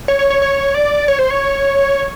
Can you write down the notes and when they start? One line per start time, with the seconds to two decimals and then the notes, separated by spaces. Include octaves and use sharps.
0.08 C#5
0.19 C#5
0.30 C#5
0.42 C#5
0.74 D5
1.08 C#5
1.19 C5
1.30 C#5